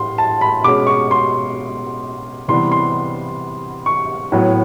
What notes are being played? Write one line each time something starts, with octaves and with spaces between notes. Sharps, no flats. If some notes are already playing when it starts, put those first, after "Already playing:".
Already playing: A2 C6
A5
B5
B2 G#3 C#4 D6
C#6
C6
C3 E3 G3 B3 C6
C6
C#6
A2 F#3 B3